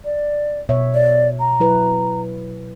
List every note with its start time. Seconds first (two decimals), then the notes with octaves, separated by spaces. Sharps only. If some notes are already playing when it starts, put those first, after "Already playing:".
0.05 D5
0.69 B2 C#5 E5
0.94 D5
1.40 A#5
1.60 F#3 E4 B4